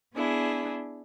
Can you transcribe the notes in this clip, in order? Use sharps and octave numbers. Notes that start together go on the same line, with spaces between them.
B3 D4 E4 G#4